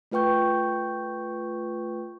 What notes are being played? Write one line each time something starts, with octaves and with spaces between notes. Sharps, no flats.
A3 F4 B4 G5 C#6 G6